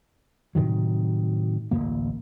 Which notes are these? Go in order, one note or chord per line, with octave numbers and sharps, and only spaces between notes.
A2 C3 D#3 F#3
D1 A1 B2 A#3